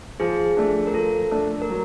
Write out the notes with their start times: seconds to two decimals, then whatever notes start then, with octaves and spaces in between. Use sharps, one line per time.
0.20 F3 G#4
0.57 A3 D4
0.87 A#4
0.94 F3 A4
1.31 A3 D4
1.62 A#4
1.70 F#3